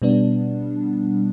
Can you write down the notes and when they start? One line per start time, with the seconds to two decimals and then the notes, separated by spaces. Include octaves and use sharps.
0.02 B2 G3 B3 D4